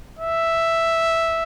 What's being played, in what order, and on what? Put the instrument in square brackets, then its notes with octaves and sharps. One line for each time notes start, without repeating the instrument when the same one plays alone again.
[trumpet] E5